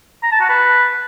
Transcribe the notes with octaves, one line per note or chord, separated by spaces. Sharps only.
A#5
A5
F#4
B4